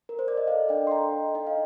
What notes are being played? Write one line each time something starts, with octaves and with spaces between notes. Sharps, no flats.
A#4
C5
D5
D#5
A4 D5 F5
D4 D#5 G5
C6
A4 G5 A#5
A4
D#4 D#5 G5
F5